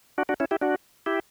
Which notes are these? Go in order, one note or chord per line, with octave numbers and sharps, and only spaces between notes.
D4 F#4
D4 F#4
C#4 E4
E4 G4
D4 F#4
E4 G4